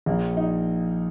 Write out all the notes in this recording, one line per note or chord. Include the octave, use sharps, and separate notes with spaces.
A#1 A#3
D#4